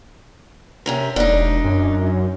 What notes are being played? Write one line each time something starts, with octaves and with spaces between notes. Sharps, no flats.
C3 C#4 A#4
E1 D4 D#4
F#2